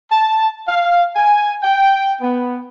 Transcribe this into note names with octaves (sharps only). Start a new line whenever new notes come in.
A5
F5
G#5
G5
B3